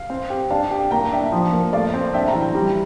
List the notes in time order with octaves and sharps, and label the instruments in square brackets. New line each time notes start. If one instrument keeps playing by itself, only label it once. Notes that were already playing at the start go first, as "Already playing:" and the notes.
Already playing: [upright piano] F5
[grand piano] C4
G4
[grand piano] D4 [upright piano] F5 A5
[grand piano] G4
[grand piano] A#3 [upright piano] G5 A#5
[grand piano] D4 [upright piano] E5 G5
[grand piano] F3
A#3
[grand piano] A3 [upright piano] D5 F5
[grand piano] C4
[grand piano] D4 [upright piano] E5 G5
[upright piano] G5 A#5
[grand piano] E3
[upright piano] G5 A#5
[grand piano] G3